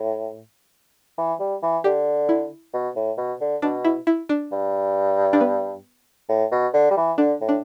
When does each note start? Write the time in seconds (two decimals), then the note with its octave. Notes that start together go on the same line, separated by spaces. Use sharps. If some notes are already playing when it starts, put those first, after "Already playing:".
Already playing: A2
1.18 E3
1.40 G3
1.63 E3
1.84 D3 G4
2.29 E4
2.73 B2
2.96 A2
3.18 B2
3.41 D3
3.62 B2 D4
3.85 E4
4.07 E4
4.29 D4
4.52 G2
5.33 D4
5.41 B3
6.29 A2
6.52 B2
6.73 D3
6.91 G3
6.97 E3
7.18 D3 D4
7.41 A2
7.49 D4